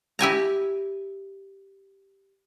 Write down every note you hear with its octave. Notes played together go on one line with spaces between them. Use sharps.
E4 G4 G#5 A#5